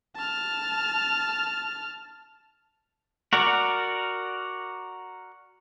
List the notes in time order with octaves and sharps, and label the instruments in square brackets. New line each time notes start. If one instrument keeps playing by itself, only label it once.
[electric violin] A5 F6
[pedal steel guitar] F#4 A#4 D5 F#5